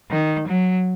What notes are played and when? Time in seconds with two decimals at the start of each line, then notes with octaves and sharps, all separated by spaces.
0.11 D#3
0.48 F#3